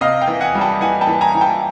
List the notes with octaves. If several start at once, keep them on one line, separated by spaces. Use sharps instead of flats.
C3 D#5 F5
F5 G5
E3
F#5 G#5
G3
G5 A5
E3 F#5 G#5
G5 A5
E3
G#5 A#5
E3
G5 A5